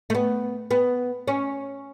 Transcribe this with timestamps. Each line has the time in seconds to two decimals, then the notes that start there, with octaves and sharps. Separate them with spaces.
0.10 A3
0.15 B3
0.71 B3
1.28 C#4